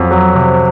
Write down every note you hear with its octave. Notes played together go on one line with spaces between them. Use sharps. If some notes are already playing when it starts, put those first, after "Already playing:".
Already playing: F2 F#3
F#3
C3